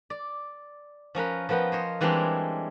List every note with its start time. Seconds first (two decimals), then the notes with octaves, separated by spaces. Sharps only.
0.10 D5
1.15 F3 C#4 A#4 B4
1.49 F3 B3 A#4 B4 G5
1.72 C5 C#5 D#5
2.01 E3 G3 G#3 C4 D4 E4